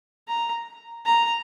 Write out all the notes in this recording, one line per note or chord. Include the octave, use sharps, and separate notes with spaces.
A#5
A#5